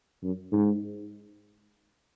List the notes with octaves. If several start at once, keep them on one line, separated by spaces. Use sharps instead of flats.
F#2
G#2